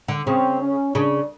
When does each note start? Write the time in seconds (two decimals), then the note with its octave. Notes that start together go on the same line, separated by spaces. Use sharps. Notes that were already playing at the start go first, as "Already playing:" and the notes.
0.08 D3
0.27 C#3 C4
0.61 C#4
0.94 C#3 D4